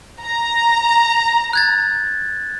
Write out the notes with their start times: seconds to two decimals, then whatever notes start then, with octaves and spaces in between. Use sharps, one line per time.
0.21 A#5
1.53 F#6 G#6 A6